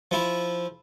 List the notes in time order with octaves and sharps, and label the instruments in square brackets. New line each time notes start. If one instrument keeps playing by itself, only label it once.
[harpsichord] F3 E4